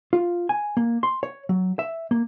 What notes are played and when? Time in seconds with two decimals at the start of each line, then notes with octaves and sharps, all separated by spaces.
0.13 F4
0.49 G#5
0.77 A#3
1.03 C6
1.23 C#5
1.49 F#3
1.79 E5
2.11 A#3